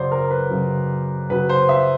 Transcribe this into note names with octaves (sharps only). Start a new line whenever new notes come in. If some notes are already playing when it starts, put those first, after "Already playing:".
Already playing: F#2 C#3 F#3 C5 D5
A#4
B4
F#2 C#3 F#3
F#2 C#3 F#3 B4
C5
E5